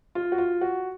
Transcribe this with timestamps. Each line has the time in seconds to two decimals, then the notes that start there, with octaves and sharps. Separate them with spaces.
0.15 F4
0.32 F#4
0.38 F4
0.61 F#4